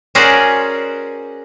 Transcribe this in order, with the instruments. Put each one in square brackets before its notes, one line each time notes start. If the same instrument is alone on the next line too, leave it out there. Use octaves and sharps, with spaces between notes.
[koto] C#4 F#4 G#4 A#4 C5 D5